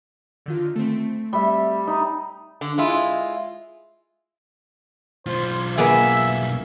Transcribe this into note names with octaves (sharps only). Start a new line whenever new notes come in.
D3 D#3 F4
A3 C4
G3 E5
D#4
D3
G#3 E4 F4
B1 F4 C5
A#3 B3 G#4 E5